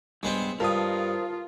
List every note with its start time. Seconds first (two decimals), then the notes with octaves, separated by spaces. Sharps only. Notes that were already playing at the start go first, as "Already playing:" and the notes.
0.23 G2 G#3 B3 C4
0.60 G2 F4 A#4 C5 A5 D#6